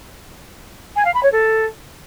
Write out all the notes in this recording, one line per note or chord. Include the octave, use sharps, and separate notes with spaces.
G#5
F5
B5
C#5
A4